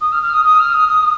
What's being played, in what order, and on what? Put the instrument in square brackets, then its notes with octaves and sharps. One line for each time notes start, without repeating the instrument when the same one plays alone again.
[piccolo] D#6
F6
F6
D#6
D#6
F6
D#6
D#6
D#6